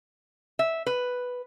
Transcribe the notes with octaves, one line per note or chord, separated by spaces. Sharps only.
E5
B4